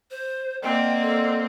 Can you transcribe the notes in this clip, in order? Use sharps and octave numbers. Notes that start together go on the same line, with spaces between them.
C5
A#3 C4 D5 D#5 F#5 G5
A4